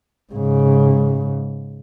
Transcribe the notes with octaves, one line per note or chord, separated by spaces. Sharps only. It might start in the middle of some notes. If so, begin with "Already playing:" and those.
G#2 C#3